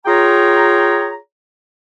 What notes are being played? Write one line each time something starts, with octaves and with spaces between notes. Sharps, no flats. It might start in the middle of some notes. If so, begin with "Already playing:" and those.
F4 G#4 C#5 G5 A#5